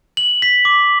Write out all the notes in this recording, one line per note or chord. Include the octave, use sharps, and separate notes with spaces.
F#7
B6
D6